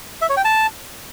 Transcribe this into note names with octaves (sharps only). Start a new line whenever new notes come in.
E5
C#5
G5
A5